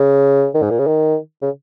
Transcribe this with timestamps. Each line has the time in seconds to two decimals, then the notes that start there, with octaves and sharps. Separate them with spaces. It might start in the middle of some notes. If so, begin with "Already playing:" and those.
Already playing: C#3
0.54 D#3
0.62 G#2
0.70 A#2
0.79 C#3
0.87 D#3
1.42 C#3